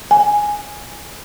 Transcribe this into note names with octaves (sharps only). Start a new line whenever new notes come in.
G#5